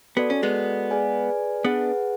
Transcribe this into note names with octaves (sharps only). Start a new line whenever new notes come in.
B3 F#4 A4 D5
C#4
G#3 B3
G#4 B4 D5 G#5
B3 D4 G#4 B4 F#5